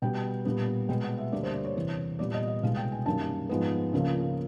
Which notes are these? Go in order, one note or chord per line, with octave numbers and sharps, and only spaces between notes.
B2 G3 B3 G5
A#2 G3 B3
B2 G#3 B3 G5
F#5
E5
D2 D3 G3 A#3 D5
C5
D5
C#5
E2 C3 E3
A#2 G3 B3 D5
D#5
D#5
C2 B2 G#3 F5
G5
G#5
F#2 D#3 G3 A#3 A5
G#2 F3 G#3 B3
C#2 C#3 F3 A#3